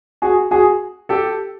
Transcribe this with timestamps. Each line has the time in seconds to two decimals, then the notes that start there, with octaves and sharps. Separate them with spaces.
0.22 F#4 G#4
0.51 F#4 G#4
1.09 G4 A4